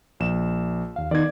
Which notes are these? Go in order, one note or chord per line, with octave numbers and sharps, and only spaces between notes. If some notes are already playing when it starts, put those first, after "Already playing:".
A#1 E7
D#2 F5
D#3 B3 D#4 D5 G#6